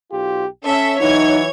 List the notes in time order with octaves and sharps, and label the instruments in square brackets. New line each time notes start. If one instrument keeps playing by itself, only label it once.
[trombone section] B1 F4 G4
[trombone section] C#4 [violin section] A4 E5
[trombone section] E3 F#3 E4 [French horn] D#4 [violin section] C#5 G#6